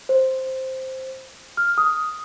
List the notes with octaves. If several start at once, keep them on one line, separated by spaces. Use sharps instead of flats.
C5
F6
D#6